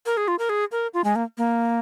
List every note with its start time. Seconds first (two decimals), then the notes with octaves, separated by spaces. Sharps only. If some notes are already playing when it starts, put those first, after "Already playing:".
0.06 A#4
0.17 G#4
0.28 F4
0.39 A#4
0.49 G#4
0.72 A#4
0.94 F4
1.04 G#3
1.15 A#3
1.38 A#3